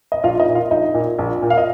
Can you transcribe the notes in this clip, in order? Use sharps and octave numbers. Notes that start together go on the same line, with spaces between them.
D#5
A#1 F4 F5
D#4 D#5
A#2
F4 F5
A#1 D#4 D#5
A#2
A#1
A#2
F5
D#5